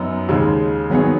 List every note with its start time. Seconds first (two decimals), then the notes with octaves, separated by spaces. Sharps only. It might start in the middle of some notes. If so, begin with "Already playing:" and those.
Already playing: F#2 F#3 B3 D#4
0.29 D#2 C#3 G#3
0.90 D#3 F#3 B3 G#4 C#5